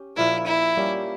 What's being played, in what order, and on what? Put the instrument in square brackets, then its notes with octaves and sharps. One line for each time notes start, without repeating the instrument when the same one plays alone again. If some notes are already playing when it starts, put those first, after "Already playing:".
Already playing: [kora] C#4 G4
[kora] A#2 F3 A#3 [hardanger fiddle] E4
[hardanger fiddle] E4
[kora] G3 A#3 C#4 G4